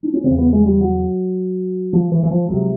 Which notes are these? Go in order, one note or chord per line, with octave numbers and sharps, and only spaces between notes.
D4
C#4
E2 C#3 C4
B3
G#3
G3
F#3
F3
E3
E3
F3
C#2 C3 F#3